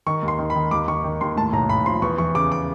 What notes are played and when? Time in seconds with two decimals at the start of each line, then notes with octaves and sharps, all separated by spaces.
0.06 D#3 C#6
0.22 D#2
0.28 C6
0.39 D#3
0.50 B5
0.55 D#3
0.71 D#2 D6
0.88 D#3 C#6
1.04 D#3
1.21 D#2 C6
1.36 A2 A5
1.53 B1 A#5
1.69 B1 B5
1.86 F3 C6
2.02 E2 C#6
2.18 E3 C#6
2.35 C#3 D6
2.52 D6